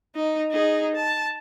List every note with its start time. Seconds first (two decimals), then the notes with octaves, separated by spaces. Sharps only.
0.16 D#4
0.51 D#4 G#4
0.95 A5